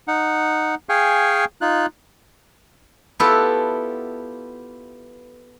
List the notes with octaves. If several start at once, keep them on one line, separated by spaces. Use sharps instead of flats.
D#4 F#5
G#4 F5 G5 G#5 C#6
D#4 F4 F#6
B3 E4 F4 G4 A4 B4